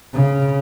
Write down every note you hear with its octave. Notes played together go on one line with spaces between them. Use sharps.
C#3